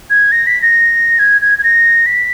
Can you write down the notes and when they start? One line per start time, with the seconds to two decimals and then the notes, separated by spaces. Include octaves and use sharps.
0.10 G#6
0.32 A#6
0.47 B6
0.62 A#6
1.19 G#6
1.41 G#6
1.59 G#6
1.64 A#6
2.06 B6